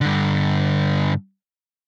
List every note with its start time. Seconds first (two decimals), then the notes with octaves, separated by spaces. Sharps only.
0.01 G2 D3